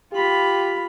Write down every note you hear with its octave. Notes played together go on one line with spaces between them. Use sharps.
F4 G4 B5